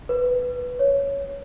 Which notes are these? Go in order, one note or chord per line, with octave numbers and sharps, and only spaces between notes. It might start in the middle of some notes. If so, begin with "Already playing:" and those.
B4
C#5